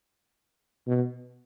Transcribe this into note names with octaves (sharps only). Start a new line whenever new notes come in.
B2